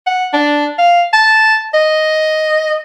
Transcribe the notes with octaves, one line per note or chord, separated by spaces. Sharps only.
F#5
D4
F5
A5
D#5